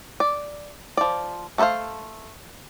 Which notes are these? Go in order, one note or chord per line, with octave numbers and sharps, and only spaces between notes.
D5
F3 D5
A3 A4 B4 C5 F5